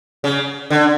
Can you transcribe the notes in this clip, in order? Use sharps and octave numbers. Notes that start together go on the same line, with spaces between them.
C#3
D3